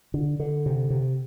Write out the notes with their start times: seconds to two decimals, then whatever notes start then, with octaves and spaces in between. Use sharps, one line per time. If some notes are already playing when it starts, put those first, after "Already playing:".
0.14 D3
0.40 D3
0.66 C3
0.90 C3